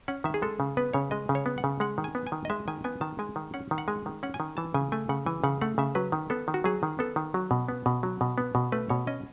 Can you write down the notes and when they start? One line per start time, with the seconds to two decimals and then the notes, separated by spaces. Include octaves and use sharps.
0.08 C#4 F#5
0.24 D#3 E5
0.34 G#4
0.42 G#3 A4
0.60 C#3
0.77 B3 B4
0.93 C#3 C#5
1.11 G#3 D#5
1.29 C#3
1.35 C#5
1.46 B3
1.58 F#5
1.64 C#3
1.80 G#3 F#5
1.98 D#3
2.04 G#5
2.15 B3
2.27 G#5
2.32 D#3
2.45 D#5
2.50 G#3 E5
2.68 D#3 G#5
2.84 B3 G#5
3.01 D#3 A5
3.19 G#3 G#5
3.36 D#3
3.54 C#4 F#5
3.71 D#3
3.78 F#5
3.88 G#3 G#5
4.06 D#3
4.23 C#4 F#5
4.34 G#5
4.40 D#3
4.57 E3 A5
4.74 C#3 G#5
4.92 A3 G#5
5.09 C#3 F#5
5.26 E3 G#5
5.44 C#3 F#5
5.61 A3 F#5
5.78 C#3 E5
5.95 F#3 B4
6.12 D#3
6.30 B3 A4
6.48 D#3
6.54 F#4
6.64 F#3 G#4
6.83 D#3
6.99 B3 A4
7.16 D#3
7.34 F#3
7.51 B2
7.68 B3
7.86 B2
8.03 F#3
8.21 B2
8.38 B3
8.55 B2
8.72 A3 B4
8.89 B2 C#5
9.07 C#4 D#5